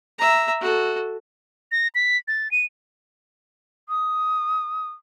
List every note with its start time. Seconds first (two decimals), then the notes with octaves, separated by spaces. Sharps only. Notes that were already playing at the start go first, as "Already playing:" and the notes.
0.19 E5 A#5
0.61 F#4 A4
1.72 A#6
1.95 B6
2.28 A6
2.51 D#7
3.88 D#6